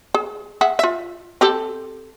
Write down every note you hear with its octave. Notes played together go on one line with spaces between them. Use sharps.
G#4
G#4 E5 F#5
F4 E5
C4 G4 A4